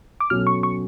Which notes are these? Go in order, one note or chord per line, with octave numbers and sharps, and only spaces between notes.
D6
B2 F#3 C#4 F#4 A4 F6
C#6
C#6